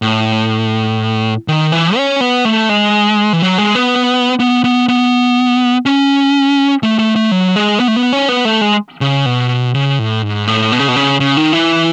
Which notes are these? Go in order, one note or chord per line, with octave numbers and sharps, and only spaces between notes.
A2
D#3
E3
C#4
B3
A3
G#3
E3
F#3
G#3
B3
B3
B3
B3
C#4
A3
A3
A3
F#3
G#3
B3
A3
B3
C#4
B3
A3
G#3
C#3
B2
C#3
A2
G#2
A2
B2
C#3
B2
C#3
C#3
D#3
E3